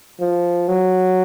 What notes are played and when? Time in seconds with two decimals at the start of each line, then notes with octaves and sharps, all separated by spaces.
0.20 F3
0.68 F#3